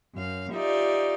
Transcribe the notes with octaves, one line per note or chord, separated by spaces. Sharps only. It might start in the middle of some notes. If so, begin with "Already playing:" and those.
F#2 F5
D#4 F4 G4 D5 E5